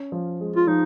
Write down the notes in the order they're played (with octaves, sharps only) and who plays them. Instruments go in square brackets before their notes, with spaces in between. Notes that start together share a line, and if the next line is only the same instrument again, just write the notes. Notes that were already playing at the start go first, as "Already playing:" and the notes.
Already playing: [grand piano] C#4
F3
G#3
[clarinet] F4
[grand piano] F3 [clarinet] D#4